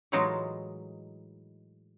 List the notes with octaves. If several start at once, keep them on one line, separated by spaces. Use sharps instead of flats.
A2 E3 F#3 G#3 D#4 F4